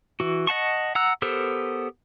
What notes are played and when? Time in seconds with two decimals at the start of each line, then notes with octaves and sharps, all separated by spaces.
0.20 E3 F#4
0.47 D#5 F#5 A5 C#6
0.95 F#5 A#5 E6 F#6
1.22 B3 G4 A4 A#4 C5